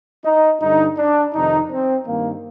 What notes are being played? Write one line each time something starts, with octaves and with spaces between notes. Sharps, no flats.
D#4
G2 D3 D#4
D4
F2 C3 D#3 D#4
C4
G2 D#3 A#3